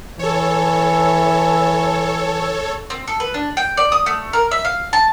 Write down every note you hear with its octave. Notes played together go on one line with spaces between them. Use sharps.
E3 A4 C#5
C4
A4
B4
D4
G5
D5
D#6
A3
A#4
E5
F5
A5